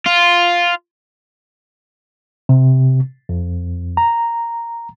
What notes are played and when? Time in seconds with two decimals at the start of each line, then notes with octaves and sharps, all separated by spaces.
0.06 F4
2.49 C3
3.29 F2
3.97 A#5